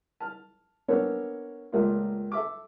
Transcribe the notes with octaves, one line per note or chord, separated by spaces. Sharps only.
A5 F6
A#3 B3 C#4 D4 A4 C#5
C#2 A#2 A3 A#3 F4
A4 E5 D6